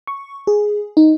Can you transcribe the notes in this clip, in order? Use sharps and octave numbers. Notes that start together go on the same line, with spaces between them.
C#6
G#4
D#4